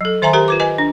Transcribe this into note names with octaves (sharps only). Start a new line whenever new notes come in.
F#3 A4
D#3 C5 E5 G#5 A#5 C6
G4 A#4 C5 A#5
F4 B4 D6
B4 D#5 G#5
D4